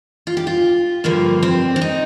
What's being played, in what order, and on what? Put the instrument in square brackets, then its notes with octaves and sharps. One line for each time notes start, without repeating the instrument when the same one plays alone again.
[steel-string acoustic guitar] F4
G4
F4
G2 D3 F3 A#3
C4
D4
D#4